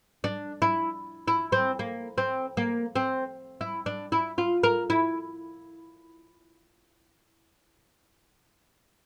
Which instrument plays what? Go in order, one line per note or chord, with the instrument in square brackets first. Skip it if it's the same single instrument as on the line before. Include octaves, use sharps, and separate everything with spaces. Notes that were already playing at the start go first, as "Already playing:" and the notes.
[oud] D4
E4
E4
C4
A#3
C4
A#3
C4
E4
D4
E4
F4
A#4
E4